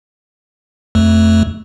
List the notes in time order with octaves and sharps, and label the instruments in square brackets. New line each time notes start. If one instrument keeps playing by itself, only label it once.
[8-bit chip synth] F2 A3